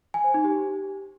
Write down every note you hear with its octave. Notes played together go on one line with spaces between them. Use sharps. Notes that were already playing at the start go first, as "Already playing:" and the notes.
G#5
C5
D#4
G4